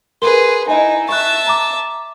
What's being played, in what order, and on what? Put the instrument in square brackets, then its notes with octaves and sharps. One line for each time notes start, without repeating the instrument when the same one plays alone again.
[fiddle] G#4 B4 [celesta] A#4 C6 G7
[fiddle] D#4 E4 [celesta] D#5 G#5
[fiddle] E5 A5 [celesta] C#6 F#6
[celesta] A#5 D6